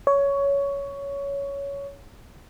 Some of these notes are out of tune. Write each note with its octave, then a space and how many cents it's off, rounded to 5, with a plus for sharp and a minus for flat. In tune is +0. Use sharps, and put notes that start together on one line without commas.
C#5 +15